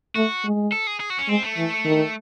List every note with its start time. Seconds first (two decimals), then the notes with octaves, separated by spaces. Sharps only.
0.16 A3 F#4
0.44 G#3
0.72 A4
0.87 G#4
1.00 G#4
1.10 F#4
1.19 C#4
1.28 G#3 C4
1.43 A3
1.57 E3
1.85 D#3